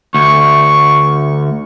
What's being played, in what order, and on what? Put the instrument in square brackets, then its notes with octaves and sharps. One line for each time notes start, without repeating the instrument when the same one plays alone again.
[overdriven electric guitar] D2 [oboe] C#6